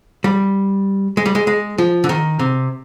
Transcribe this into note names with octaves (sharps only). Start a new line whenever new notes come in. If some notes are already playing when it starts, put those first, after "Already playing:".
G3
G#3
G3
G#3
G#3
F3
D3
D#3
C3